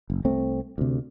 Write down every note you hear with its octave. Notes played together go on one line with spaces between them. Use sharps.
F#1
C2 A3 C4
D2 C3